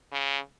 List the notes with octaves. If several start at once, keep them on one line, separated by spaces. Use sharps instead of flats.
C#3